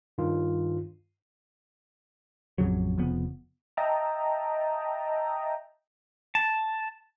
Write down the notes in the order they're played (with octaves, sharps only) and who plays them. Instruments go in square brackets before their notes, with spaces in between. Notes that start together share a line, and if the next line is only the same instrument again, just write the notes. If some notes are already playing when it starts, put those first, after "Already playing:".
[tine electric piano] G2 D#3 F4
[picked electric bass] A1 F2 C#3 F#3
F1 C#3 F3 B3
[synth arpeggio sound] D#5 E5 G5 A5 A#5
[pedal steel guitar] A5